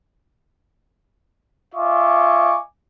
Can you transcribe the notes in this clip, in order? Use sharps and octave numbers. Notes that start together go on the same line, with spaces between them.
F4 D#5 E5 G#5 C#6 D6